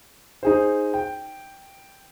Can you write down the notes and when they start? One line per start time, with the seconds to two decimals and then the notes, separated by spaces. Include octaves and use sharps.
0.43 D#4 G#4 C5
0.94 G5